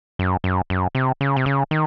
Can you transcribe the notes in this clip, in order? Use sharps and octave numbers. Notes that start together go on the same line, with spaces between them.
F#2
F#2
F#2
C3
C#3
C3
C#3
D#3